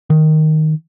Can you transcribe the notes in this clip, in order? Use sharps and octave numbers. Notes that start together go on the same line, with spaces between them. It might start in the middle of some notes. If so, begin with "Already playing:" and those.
D#3